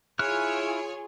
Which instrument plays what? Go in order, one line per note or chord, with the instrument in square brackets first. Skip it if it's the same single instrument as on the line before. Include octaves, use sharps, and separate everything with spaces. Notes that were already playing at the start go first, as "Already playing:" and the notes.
[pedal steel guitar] E4 F6 F#6 [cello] F4 G#4 [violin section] C#5 G#5